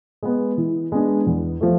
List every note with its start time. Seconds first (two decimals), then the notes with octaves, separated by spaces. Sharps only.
0.23 G#3 B3
0.57 E3
0.92 G#3 B3 D4 G#4
1.26 E2
1.61 F3 A3